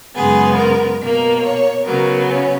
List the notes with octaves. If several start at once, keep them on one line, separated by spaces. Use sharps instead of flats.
F#2 C#3 G#3 B3 G#4
A#4
B2 A#3 A#4
C#5
C#3 F#3 B3 A#4
C#4